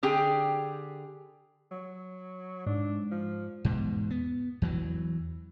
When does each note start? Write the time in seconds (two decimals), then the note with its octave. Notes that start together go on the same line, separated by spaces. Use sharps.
0.03 D3 G4 G#4 G5
1.72 F#3
2.66 G#2 D4
3.11 F3
3.65 E2 G#2 B2
4.10 B3
4.62 E2 E3 F#3